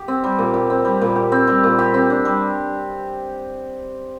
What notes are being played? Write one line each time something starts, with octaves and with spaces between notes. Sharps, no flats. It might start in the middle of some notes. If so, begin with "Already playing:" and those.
Already playing: G4
C4
G3
A#2
G4
C4
G3
A#2
G4
C4
G3
A#2
G4
C4
D4
G3